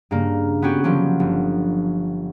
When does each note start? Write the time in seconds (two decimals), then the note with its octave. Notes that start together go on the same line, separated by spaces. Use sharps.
0.11 G2 C#3 A#3
0.62 B3 C#4 F#4 G4
0.84 D3 F3 F#3 G4
1.20 G1